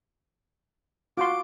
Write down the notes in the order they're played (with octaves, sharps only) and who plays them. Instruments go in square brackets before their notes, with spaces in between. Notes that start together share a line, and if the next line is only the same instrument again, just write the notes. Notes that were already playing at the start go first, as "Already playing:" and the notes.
[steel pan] F4 F#4 C6 [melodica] D6